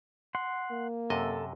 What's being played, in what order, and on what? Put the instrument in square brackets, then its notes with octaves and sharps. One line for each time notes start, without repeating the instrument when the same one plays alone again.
[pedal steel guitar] F#5 C6
[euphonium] A#3
[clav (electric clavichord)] F#2 C3 D#5 [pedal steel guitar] A4